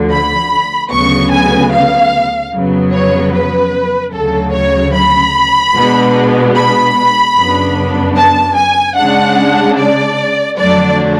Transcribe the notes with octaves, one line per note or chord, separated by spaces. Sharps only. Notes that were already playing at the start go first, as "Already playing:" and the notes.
Already playing: D2 D3 F3
B5
D2 C#3 F#3 B3 C#6
G#5
F5
F2 C#3 F#3 B3
C#5
B4
D2 C#3 F#3 A4
C#5
B5
B2 G#3 B3 D4
B5
F#2 C#3 F#3 B3 D4
A5
G#5
C#3 G#3 D4 F#5
D5
F2 D3 F#3 A3 D4 D5